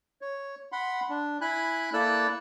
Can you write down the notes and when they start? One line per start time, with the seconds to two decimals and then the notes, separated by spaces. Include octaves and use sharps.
0.21 C#5
0.72 F#5 B5 C6
1.09 D4
1.41 E4 G#5 B5 F#6
1.93 A#3 E4 A4 D5 E6 F#6